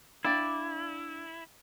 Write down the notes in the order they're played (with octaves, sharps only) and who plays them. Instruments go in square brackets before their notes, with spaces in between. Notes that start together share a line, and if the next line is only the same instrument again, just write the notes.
[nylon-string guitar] D4 F5 G5 [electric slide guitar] E4 [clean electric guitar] D5